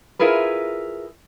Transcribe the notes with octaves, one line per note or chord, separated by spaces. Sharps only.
E4 F4 G#4 A#4 B4